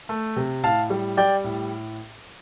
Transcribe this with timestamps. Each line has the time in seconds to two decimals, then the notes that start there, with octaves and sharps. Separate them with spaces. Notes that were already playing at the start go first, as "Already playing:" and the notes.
0.09 A3
0.36 C3
0.63 A2 F5 A5
0.90 G3
1.17 G3 D5 G5
1.44 A2